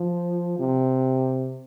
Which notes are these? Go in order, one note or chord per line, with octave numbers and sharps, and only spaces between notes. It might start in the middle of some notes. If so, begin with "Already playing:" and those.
Already playing: F3
C3